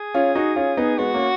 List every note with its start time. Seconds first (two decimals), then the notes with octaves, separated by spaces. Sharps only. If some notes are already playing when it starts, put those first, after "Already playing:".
Already playing: G#4
0.14 C#4 F4
0.35 D#4 F#4
0.56 C#4 F4
0.77 B3 D#4
0.98 G#3 B3 F#4
1.14 A#3 C#4